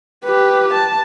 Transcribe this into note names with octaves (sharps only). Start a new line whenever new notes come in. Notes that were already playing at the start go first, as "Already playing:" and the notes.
G4 B4
A5